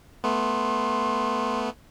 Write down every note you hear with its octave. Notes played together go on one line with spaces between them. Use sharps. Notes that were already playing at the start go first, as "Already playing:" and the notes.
A3 B3 C6